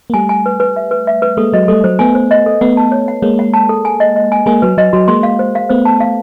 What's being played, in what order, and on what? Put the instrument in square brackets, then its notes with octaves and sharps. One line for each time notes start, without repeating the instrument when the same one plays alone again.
[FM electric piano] A#3
[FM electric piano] G3 A3 [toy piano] G#5
[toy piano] G#5
B4
B4
E5
B4
E5
B4
[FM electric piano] G#3 A#3 [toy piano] A4
[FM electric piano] F#3 G#3 [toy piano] D#5
[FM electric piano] G3 A3 [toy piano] A4
[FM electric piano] F#3 [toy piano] C5
[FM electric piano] A3 B3 [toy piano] G#5
[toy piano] C5
D#5
A4
[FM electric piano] A3 B3 [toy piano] F#5
[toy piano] A5
C#5
F#5
[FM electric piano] G#3 A#3 [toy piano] C#5
[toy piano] F#5
A5
A4
G#5
D#5
D#5
G#5
[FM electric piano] G#3 A#3 [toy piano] G#5
[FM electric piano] F#3 [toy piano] B4
[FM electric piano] F#3 [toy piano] D#5
[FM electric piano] F#3 [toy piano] F#4
[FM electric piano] G#3 A#3 [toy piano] C6
[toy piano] F5
C5
F5
[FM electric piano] A3 B3 [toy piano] C5
[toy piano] A5
F5